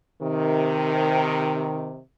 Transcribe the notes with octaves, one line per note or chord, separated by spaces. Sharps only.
C3 D#3